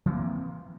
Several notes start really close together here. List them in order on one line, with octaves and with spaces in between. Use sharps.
E3 C4 A#3